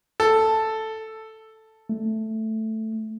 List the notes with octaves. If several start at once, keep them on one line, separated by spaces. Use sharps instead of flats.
A4
A3